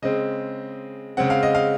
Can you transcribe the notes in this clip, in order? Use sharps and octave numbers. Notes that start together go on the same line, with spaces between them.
C#3 G#3 C4 D#5
C#3 G#3 C4 F#5
F5
D#5
F5